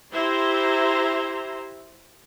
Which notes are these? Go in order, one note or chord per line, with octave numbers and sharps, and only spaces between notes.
E4 G4 C5 E5 A#5 C6